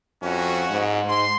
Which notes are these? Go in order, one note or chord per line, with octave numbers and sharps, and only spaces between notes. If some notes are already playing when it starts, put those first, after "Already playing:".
F2 C#4 F#4
G#2
G#2 C6